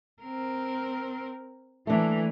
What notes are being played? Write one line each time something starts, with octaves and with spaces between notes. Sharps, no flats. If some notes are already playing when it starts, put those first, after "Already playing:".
C4 A#4
E3 A3 A#3 D4